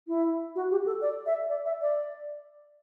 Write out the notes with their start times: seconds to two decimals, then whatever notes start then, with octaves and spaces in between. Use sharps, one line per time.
0.08 E4
0.55 F#4
0.71 G4
0.86 A4
1.02 D5
1.26 E5
1.49 D5
1.65 E5
1.81 D5